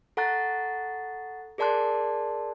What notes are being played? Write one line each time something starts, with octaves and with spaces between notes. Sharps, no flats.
A4 F#5 A#5 C#6 F#6 A6
G#4 A#4 D5 A5 C6 F#6